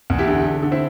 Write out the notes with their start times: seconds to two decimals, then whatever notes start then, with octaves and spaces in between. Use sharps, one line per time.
0.10 E2
0.18 E4 G4
0.28 D3
0.45 D3
0.62 D3
0.72 C4 E4